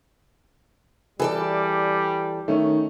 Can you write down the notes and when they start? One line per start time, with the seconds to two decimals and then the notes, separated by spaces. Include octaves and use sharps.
1.20 E3 G3 G#4 A4 D5
2.48 D#3 A3 C#4